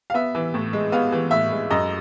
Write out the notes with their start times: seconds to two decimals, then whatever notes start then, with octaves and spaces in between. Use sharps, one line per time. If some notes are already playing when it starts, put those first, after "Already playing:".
0.10 F5
0.14 B3 E5
0.35 E3
0.54 A2
0.73 G#3
0.92 B3 F5
1.12 E3
1.31 A2 E5
1.51 G#3
1.71 F#2 D#5